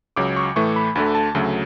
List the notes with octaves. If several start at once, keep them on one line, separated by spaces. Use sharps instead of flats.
C#2 C#3 F#3 D6
C#6
A2 E3 A3 C#6
B5
D2 D3 A3 B5
A5
D2 C#3 F#3 A3